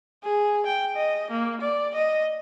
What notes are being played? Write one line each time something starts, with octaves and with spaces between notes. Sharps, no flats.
G#4
G5
D#5
A#3
D5
D#5